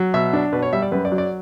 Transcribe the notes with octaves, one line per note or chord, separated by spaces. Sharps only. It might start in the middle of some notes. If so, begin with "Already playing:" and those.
Already playing: F#3
B2 E5
D4
B2 B4
C#5
G3 E5
D5
F#2 B4
D5
F#3
D5